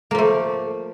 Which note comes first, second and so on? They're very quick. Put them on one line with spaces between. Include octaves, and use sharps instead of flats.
A#3 F3 A3